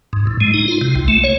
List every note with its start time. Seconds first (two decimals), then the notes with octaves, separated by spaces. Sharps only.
0.13 G#2
0.27 A2
0.41 G#3
0.54 D#4
0.68 F4
0.81 C3
0.95 C2
1.08 A3
1.24 C#5